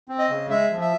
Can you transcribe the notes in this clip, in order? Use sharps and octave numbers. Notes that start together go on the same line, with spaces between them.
C4
D#5
C#3
G#3 E5
F3
E5